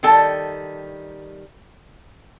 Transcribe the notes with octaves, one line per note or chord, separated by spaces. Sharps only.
D#3 G3 A4 G5 A5